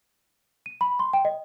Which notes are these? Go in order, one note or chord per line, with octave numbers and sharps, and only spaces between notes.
D#7
B5
C6
G5
D#5